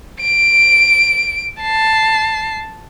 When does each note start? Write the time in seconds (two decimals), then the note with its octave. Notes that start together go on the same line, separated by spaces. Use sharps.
0.20 D7
1.62 A5 C7